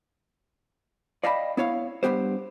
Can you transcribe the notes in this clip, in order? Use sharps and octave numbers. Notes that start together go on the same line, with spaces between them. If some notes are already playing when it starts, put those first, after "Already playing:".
D5 D#5 F5 G5 A5 B5
B3 E4 C#5 F5
G2 E3 B3 G4 C5